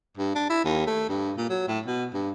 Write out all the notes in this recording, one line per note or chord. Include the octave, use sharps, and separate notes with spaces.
G2
D4
E4
D#2
A3
G2
A#2
F#3
A2
B2
G2